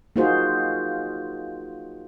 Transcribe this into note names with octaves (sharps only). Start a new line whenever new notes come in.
A#3 D#4 F4 F#4 G#4 C5